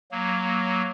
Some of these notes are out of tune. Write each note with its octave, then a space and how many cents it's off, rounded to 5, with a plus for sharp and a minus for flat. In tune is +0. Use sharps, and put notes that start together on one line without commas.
F#3 +0 A#3 +0